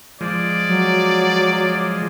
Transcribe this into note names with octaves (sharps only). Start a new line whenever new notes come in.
F3 G#3 D5
F#3